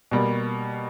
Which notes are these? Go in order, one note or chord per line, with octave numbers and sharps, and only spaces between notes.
B2 G3 A#3